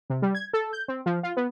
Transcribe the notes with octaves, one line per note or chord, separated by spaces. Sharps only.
C3
G3
G#6
A4
G6
C4
F3
F4
B3